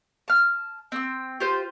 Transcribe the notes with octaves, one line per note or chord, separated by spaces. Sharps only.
A5 F6
C4 G5 E6
F4 G4 C5